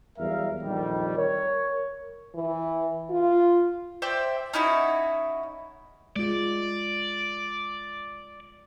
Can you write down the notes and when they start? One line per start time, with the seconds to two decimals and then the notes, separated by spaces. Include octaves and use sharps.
0.18 E2 F#3 G3 A#4 E5 F5
0.62 A#1 F2 D#3 G3
1.17 A#4 C#5
2.35 E3
3.10 F4
4.02 C5 D5 E5 G5
4.53 C#4 D#4 E4 F#4
6.16 G#3 F4 D5